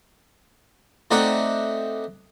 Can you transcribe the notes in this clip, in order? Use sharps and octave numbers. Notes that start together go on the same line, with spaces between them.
A3 C4 D#4 D5 F#5 G5